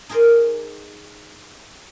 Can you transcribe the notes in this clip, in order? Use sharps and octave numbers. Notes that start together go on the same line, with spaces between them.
D#4 G#4 A#4 C5 D5 D#5